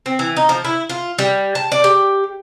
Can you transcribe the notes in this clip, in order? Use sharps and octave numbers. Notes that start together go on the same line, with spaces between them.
C4
E3
D#4
F3
E4
F4
G3
A5
D5
G4